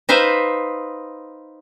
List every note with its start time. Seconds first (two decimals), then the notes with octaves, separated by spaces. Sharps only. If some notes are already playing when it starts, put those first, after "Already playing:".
0.09 D#4 B4 C5 E5 F5